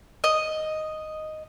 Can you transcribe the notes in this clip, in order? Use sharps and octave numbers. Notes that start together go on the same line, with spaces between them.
D#5